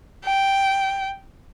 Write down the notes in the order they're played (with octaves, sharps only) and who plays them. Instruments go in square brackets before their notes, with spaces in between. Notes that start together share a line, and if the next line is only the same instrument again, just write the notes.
[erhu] G5